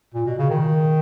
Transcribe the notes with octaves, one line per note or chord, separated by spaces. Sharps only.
A#2
B2
C#3
D#3